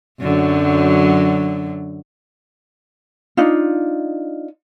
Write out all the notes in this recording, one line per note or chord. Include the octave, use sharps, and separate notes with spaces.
F#2 D3 F#3
D4 D#4 F4